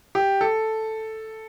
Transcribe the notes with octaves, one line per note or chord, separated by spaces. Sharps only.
G4
A4